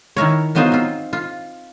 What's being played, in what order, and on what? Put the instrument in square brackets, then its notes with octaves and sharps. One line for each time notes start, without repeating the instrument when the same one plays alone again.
[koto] D#3 E4 A#4 C#5
E3 F#3 B3 D#4 F4 C5
C4 F4
F4